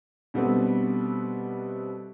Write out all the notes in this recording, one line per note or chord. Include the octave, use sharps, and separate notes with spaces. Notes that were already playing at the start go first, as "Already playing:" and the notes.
B2 G3 A3 B3 C4 D4